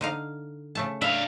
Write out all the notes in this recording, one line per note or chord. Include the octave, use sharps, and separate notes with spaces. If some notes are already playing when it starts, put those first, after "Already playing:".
D3 D#4 F5
C#3 A3 A5
D4 E5 F5